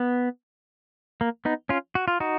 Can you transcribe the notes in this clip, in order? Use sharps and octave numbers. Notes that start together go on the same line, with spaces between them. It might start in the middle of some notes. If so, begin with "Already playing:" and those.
Already playing: B3
A#3
B3 D#4
C#4 F4
F#4
F4
D#4 F#4